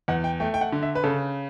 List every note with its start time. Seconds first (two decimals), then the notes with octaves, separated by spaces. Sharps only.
0.08 E2 F#5
0.24 G5
0.40 A3 G5
0.54 G5
0.61 F#5
0.72 D3
0.83 E5
0.95 B4
1.04 C#3 A4